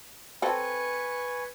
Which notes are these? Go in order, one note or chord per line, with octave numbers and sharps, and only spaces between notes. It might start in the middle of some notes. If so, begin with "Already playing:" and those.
C4 A4 B4 G#5 C#6